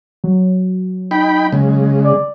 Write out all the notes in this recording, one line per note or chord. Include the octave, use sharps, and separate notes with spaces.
F#3
D#4 G5 B5
C#3 G#3
D5